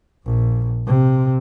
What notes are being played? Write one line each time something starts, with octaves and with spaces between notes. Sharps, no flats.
A#1
C3